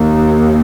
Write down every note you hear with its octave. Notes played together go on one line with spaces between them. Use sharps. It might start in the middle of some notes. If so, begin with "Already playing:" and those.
Already playing: D#2